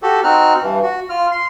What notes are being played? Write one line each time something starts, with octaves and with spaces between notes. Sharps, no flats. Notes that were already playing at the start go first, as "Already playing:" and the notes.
F#4 G4 A4
C4 D#4 F#4 F6 F#6
G2 E3
F#4
F4 F6
C6